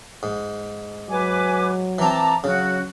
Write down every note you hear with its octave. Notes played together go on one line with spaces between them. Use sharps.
G#2
F#3 B4 G#5 D6
E3 C4 A5 A#5 D6
C#3 F#3 F#4